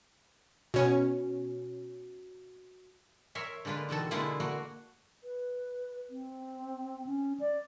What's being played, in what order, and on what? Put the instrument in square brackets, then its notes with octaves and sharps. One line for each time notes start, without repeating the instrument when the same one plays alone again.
[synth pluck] B2 C#4 [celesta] F#4
[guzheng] A#4 C#5 E5 C6
D3 G#3 A#3 F4 B4
E2 B2 D#3 A4
B2 D3 G#3 A#3 E4 F4
A3 A#3 F#4 F#5
[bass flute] B4
C4
C#4
D5